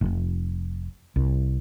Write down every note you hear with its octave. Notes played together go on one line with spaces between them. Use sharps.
F1
C2